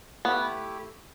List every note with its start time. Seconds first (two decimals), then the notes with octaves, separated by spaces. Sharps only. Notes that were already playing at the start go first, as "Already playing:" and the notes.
0.25 A3 B3 E4 G4